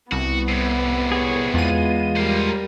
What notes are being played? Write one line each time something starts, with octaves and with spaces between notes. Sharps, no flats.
C2 B3 F#4
A2 C3
G#4 C#5
E2 G#3 F4 D#7
G3 A#3 A#4 C5